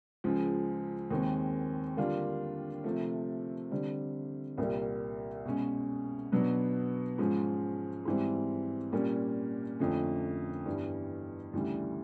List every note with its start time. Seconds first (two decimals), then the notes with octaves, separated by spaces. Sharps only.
0.24 C#2 C#3 F3 G#3
1.11 D#2 D#3 G#3 C4
1.97 D3 G3 A#3 D4 F4
2.84 C3 F3 A3
3.71 D3 G3 C4
4.58 C2 A#2 G3 A#3
5.45 B2 G#3 C#4
6.32 B2 F#3 B3 D4
7.18 G#2 F3 G#3 C#4
8.05 G#2 E3 G3 C4
8.92 A#2 G3 A#3 C#4
9.79 F2 D3 F3 A3 C#4
10.66 G2 E3 G3 B3
11.54 D2 C#3 E3 G3